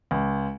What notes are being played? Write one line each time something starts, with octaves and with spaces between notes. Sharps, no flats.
C#2